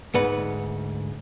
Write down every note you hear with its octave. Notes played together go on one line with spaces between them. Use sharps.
D2 G#2 B4 F#5